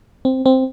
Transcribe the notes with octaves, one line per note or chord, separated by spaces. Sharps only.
C4
C4